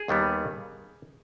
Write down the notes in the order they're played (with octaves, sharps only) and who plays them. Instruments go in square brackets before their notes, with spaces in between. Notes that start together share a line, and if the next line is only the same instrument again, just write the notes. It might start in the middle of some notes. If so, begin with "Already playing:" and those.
Already playing: [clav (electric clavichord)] G#4
D#2 D#3 G3 B3